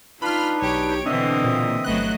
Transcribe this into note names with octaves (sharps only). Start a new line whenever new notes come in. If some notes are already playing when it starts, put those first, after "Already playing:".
D4 D#4 F4 B4 B5 F6
B1 G4 C#5 D7
B2 D3 E3 C4 D4 D#5 E5 D#6
A#2
G1 F#3 A3 B3 D#5 F#6